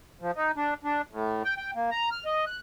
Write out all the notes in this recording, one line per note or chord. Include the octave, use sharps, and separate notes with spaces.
F3
D#4
D4
D4
A2
G5
G5
A#3
A#5
F6
D#5
F#6